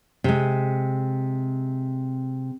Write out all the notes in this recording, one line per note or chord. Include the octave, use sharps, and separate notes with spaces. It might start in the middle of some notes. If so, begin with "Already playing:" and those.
C3 G#3